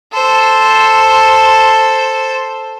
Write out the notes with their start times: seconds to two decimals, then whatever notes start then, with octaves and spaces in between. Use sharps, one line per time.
0.13 A4 C5